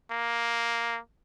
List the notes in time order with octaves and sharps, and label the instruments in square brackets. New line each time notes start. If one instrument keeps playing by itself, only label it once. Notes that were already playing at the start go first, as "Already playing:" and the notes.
[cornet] A#3